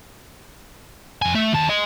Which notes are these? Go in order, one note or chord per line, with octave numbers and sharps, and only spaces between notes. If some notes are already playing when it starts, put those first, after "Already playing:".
F2 G#5
A3 E5
D#2 A5
D#5 G#5